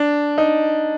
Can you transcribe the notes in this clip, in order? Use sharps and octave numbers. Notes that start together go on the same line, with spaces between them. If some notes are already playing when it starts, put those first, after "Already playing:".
Already playing: D4
D#4